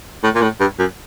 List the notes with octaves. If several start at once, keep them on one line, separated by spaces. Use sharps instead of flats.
A2
A#2
A2
G2
F#2